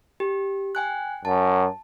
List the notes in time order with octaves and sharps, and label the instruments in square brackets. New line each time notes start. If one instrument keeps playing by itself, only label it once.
[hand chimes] G4
G5 G#5 F#6
[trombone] F#2 [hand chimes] A5